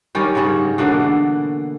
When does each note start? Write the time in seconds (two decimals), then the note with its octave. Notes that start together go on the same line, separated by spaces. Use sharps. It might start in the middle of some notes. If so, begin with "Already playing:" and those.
0.15 D#3 G3 C#4 G4
0.35 G#2 C#3 G3 E5
0.78 B2 D3 E3 A#3